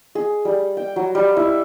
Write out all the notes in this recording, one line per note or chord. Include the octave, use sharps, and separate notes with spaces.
G#4
G3
G5
F#3
G3
E4